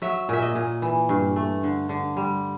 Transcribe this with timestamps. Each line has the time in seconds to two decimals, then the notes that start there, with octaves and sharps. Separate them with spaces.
0.02 F#3 E5
0.29 A#2 E5
0.42 D#5
0.55 A#2
0.82 E3
1.09 G2
1.36 A3
1.63 D3
1.89 D3
2.17 G3